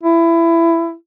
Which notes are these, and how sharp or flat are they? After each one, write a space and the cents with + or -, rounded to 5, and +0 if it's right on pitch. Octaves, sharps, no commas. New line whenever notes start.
E4 +20